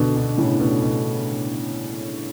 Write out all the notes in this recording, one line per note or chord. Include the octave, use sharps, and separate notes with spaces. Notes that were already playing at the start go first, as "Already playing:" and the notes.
Already playing: B2 D3
B2
A2 C#3
B2
B2